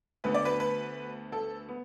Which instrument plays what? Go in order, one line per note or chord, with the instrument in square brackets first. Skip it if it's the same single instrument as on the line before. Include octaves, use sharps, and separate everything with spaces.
[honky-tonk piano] D2 D3 B3 B4
D5
B4
B4
A4
B3